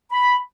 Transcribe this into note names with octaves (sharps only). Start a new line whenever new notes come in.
B5